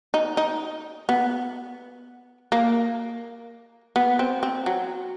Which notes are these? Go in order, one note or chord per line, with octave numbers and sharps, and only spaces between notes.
D#4
D#4
B3
A#3
B3
C4
C4
F#3